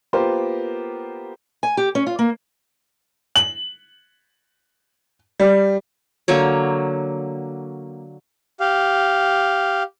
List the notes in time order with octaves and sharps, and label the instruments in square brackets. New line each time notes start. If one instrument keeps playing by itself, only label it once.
[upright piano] A#3 B3 F4 G4 A#4 C5
[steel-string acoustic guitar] G#5
G4
C#4
F4
A#3
[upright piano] F#7
G3
[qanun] D3 F#3 A#3 C#5
[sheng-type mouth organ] G4 F5